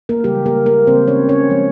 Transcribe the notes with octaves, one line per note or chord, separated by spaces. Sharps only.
A#3 A#4
C#3 E3 G3 G#3 G4
A#3 A#4
A#3 A#4
C#3 E3 G#3 C4 C5
C#4 C#5
C#4 C#5
F3 G#3 C4